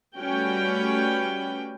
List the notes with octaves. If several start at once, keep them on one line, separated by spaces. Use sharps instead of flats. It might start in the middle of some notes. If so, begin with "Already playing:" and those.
G3 A3 C#4 F#4 B4 G5